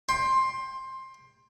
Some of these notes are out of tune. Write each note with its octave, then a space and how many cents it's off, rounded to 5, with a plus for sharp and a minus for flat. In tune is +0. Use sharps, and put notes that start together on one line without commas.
G5 +20 C6 +15